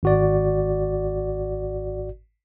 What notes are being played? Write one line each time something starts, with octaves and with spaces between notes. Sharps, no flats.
G#1 F#4 D5